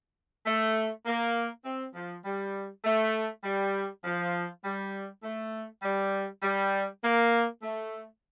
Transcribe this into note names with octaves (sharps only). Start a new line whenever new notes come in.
A3
A#3
C4
F3
G3
A3
G3
F3
G3
A3
G3
G3
A#3
A3